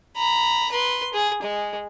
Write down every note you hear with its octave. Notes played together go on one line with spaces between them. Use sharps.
A#5 B5
B4 C6
G#4
G#3